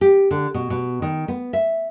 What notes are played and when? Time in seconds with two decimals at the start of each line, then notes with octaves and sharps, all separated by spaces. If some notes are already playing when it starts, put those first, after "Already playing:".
0.01 G4
0.31 D3
0.54 B2
0.70 B2
1.02 D#3
1.28 B3
1.53 E5